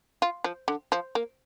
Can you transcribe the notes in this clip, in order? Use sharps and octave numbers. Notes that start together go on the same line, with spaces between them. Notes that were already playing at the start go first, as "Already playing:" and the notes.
F4
F3
D3
F3
A#3